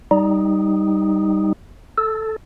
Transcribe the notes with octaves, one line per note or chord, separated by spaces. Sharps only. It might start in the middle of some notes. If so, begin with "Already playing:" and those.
G3 D#4
A4